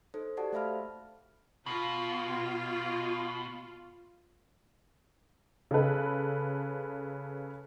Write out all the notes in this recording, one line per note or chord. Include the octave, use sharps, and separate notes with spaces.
D#4 A4 C5
F#4 G4 A4 D5 F#5 A5
A3 C5 E5 F5 B5 F6
B2 F4
C#3 A4 B4